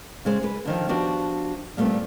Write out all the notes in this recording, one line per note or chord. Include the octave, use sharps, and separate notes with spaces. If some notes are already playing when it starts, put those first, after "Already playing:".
C#3 G#3 C5
G#3 G#4 B4
D3 D#3 F3
F3 B3 D4 F#4 G4
A#2 G3 A3 B3 C4